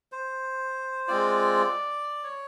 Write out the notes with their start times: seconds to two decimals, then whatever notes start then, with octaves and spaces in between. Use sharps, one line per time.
0.12 C5
1.08 G#3 C4 F4 D5
2.24 C#5